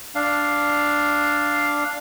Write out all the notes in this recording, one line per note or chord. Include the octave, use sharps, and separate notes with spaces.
D4 F5